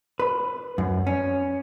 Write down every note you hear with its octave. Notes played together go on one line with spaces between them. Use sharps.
B4
F#2
C#4